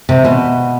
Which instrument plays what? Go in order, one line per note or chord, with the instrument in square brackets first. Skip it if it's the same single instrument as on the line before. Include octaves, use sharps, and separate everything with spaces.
[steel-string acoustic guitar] C3
B2